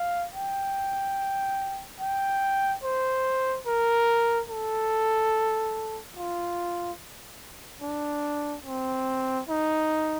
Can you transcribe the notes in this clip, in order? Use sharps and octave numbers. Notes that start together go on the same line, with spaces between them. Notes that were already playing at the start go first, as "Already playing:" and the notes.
Already playing: F5
G5
G5
C5
A#4
A4
F4
D4
C4
D#4